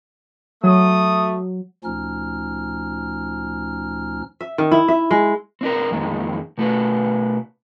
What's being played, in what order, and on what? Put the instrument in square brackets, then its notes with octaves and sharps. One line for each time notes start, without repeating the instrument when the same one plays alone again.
[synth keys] F#3 [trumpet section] A3 D#6
[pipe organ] D2 A#2 F3 C#4 D#4 F6
[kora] E5
D#3
E4
E5
G#3
[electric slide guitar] C4 D4 A#4
F2 A#2 D#3 G#3
B2 A3 F#4 B4